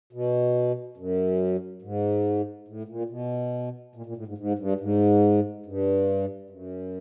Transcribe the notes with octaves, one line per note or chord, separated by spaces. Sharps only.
B2
F#2
G#2
A2
A#2
B2
A#2
A#2
A2
G#2
G#2
G2
G#2
G2
F#2